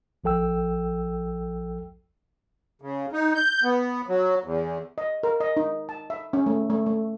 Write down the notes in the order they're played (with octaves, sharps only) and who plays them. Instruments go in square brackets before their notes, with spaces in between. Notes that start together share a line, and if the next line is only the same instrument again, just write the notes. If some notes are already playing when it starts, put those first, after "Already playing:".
[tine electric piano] A#1 F3 A4 G5 E6
[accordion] C#3
D#4
G6
B3
F#3
E2
[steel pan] D#5
A#4
D#5
D#4
A5
E5
C#4
A3
A3
A3